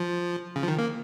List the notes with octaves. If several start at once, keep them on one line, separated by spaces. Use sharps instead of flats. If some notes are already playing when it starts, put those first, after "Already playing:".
Already playing: F3
C#3
F3
D#3
A#3